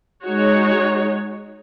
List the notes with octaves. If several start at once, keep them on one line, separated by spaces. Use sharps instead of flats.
G#3 D#4 F#4 C#5